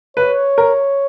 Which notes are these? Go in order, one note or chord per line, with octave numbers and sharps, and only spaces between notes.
B4 C#5
A#4